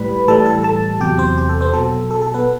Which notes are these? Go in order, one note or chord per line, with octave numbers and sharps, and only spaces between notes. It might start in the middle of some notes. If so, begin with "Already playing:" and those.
Already playing: A2 G3 B4 B5
A2 E3 G3 A4 A5
A4 A5
A4 A5
E2 C3 F#3 G4 G5
C4 C5
G4
A4
C4 C5
B2 F#3 A4
A4
A4
B3 B4